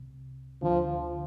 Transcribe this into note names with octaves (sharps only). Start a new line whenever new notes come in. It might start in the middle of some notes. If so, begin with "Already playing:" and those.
Already playing: C2 C3
D2 D3 F3